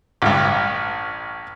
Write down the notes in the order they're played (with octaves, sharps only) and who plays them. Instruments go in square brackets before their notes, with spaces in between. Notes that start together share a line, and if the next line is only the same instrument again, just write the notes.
[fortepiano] A1 G2